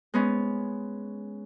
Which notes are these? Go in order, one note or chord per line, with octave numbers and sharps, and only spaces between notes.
G#3 B3 C#4